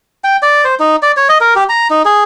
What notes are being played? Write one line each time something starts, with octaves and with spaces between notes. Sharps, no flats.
G5
D5
C5
D#4
D5
C#5
D#5
A#4
G4
A#5
D#4
G#4